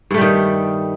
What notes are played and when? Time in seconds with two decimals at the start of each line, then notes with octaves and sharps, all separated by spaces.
0.11 G2
0.14 A3
0.18 G3
0.21 D#3